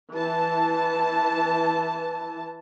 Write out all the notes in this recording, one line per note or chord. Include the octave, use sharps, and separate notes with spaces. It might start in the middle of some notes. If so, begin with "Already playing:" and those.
E3 A5